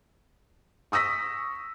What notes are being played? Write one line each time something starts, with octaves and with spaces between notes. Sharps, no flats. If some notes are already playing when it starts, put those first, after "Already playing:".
C#6 D#6 E6 A#6 B6